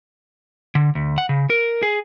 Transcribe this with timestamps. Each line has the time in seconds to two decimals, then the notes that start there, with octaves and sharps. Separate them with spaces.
0.75 D3
0.95 D2
1.18 F#5
1.29 C#3
1.50 A#4
1.83 G#4